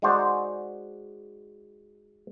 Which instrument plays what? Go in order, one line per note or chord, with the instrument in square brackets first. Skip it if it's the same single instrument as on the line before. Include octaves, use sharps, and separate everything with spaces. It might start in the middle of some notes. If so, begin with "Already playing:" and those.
[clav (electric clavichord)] G#3 D#4 F#4 C5 D5